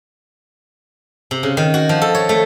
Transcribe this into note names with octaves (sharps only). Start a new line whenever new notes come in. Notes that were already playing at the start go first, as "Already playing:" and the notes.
C3
C#3
D#3
F#4
F3
A4
C#5
A3